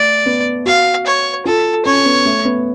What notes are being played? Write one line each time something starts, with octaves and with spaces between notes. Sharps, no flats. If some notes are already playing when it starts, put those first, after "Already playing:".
Already playing: A3 D5
B3
F#4 F5
C#5
F4 A4
C#4 C#5
B3
A3
B3